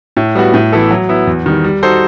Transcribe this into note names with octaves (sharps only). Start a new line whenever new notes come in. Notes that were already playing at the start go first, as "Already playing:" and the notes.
A2
G3 B3 F#4
A2
E3 B3 E4 A4
F#3
B3 E4
E2
D#3 G3
G3
D#4 F#4 A4 C5